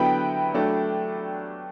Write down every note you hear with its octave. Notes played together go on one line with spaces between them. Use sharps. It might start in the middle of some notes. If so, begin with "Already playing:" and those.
Already playing: D3 F#3 B3 E4 G5 B5
F#3 A3 D4